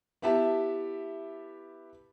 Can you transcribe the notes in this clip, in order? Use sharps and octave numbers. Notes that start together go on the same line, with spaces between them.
B3 E4 G4 E5 A5